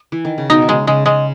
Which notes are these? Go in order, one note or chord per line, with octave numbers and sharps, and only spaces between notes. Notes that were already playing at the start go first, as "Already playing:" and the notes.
Already playing: G3
E3
D#3
C#3
B2 D#4
D#3
C#3 G#3
C#3 G#3
C#3 G#3